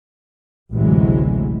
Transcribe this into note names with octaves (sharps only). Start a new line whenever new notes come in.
A1 D2 C3 E3 F#3 G#3